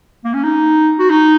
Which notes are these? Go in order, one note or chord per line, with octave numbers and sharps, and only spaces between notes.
A#3
C#4
D#4
F#4
D#4